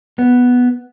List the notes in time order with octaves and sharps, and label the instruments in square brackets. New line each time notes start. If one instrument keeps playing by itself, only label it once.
[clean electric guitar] B3